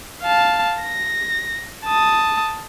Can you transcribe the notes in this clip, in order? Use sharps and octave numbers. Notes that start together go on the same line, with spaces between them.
F5 A5
A#6
A5 D#6